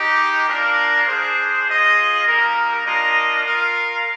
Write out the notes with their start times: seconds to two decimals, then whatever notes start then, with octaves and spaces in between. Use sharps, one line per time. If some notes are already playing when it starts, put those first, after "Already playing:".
Already playing: G#3 D#4 G4
0.48 A#3 D4 F4 A#4
1.07 D4 G#4 C5
1.67 F4 G#4 D#5
2.26 G3 A#3 D#4 A#4
2.85 A#3 D4 F4 A#4 D#5
3.44 F4 A#4 F5